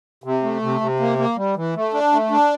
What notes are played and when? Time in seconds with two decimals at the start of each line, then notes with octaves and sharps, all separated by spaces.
0.24 C3
0.43 A3
0.62 C3
0.81 C3
1.00 A#3
1.18 A#3
1.37 G3
1.56 E3
1.75 A3
1.93 D4
2.12 A3
2.30 D4